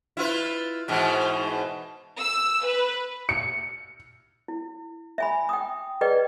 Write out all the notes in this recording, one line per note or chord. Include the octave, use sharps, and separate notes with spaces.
E4 F4 B4
G#2 B2 E3
E6
B4
C#7
E4
E5 G#5 B5
G5 D#6
G#4 B4 D5 D#5 G5